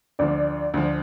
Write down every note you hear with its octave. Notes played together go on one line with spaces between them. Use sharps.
D2 D3 F3 D5
D2 D3 F3